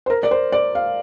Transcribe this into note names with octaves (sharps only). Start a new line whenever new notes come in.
C5
A#4
D5
C5
D5
F5